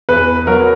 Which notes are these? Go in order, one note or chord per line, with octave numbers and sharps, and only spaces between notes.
E2 B4
F#3 A#4